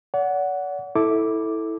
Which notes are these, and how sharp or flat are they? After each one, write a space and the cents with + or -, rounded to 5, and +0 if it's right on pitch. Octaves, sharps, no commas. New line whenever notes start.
D5 -45 F#5 +0
E4 -15 A4 +0 D6 +0